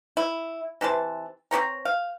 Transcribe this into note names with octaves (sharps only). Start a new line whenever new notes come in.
E4
C3 E3 C5 A5
C4 G4 C#5 A#5
F5